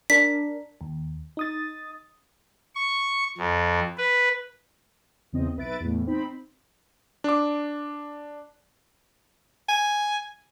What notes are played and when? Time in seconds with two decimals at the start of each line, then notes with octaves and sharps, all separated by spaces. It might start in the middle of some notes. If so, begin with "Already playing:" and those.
0.10 D4 A#4 B6
0.81 D#2
1.37 D#4 D#6 A6
2.75 C#6
3.38 F2
3.98 B4
5.33 E2 C#3 C4 D#5
5.57 B1 B4 E5 A6 D7
5.80 E2 A2
6.07 C4 D#4 B5
7.24 D4 D6
9.69 G#5